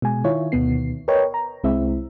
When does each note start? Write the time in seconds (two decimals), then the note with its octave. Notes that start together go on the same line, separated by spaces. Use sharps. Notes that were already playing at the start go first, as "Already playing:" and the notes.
0.02 B2 G#3 G#5
0.24 D#3 E4 F4 C#5
0.52 D2 B2 D#3 B3 C7
1.08 A#4 B4 C#5 D#5 G5
1.34 A#5
1.64 C2 G#3 C4 E4 E5